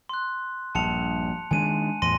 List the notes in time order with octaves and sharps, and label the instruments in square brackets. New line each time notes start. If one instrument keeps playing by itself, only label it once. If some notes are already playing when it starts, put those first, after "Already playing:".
[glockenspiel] C6 F#6
[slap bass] A#1 G2 [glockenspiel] A5 C#7 F7
[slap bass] D#3 G#3 D4 [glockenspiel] G#5 D#7
[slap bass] E2 A2 [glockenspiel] C6 A#6 D#7